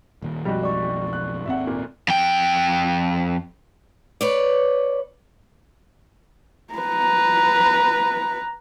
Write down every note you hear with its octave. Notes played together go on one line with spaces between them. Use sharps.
D#1 D#2
B1 F2 G3 G#3 F#4
D5 C#6
F#6
G#1 D#2 C4 E5 F#5
A#2
F2 G5
B4 C#5 D5
B4 A#5